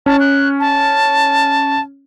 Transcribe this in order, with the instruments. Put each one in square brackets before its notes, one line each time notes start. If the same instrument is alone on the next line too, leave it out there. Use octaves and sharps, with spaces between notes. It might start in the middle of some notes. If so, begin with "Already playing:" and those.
[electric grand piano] C#4 [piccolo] A5
[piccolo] F#6
A5